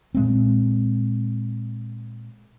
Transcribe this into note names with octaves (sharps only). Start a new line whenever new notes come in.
A#2 G#3 C4